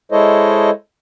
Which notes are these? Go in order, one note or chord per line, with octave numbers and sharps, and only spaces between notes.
G#3 E4 A4 C5 C#5 D#5